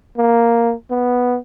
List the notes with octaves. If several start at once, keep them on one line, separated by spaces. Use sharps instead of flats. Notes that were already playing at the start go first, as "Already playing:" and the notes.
A#3
B3